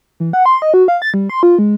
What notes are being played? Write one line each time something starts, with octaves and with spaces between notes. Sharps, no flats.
E3
F#5
C6
D#5
F#4
F5
A6
G3
C6
F4
G#3